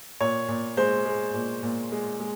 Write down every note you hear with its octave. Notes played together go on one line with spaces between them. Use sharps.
A#2 C#5
A#2
G#3 C5
G#3
A#2
A#2
G#3
G#3